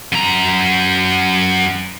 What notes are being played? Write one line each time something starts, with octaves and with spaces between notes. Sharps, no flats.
F#2 A#5